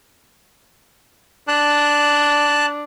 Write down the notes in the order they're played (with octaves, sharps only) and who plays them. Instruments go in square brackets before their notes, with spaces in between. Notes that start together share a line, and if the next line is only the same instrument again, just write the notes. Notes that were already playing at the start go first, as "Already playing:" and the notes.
[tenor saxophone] D4 [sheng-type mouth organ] A5 F#6